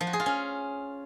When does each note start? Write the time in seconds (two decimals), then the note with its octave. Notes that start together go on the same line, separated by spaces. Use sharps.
0.01 F3
0.07 F#4
0.13 G#4
0.20 F4
0.26 C#4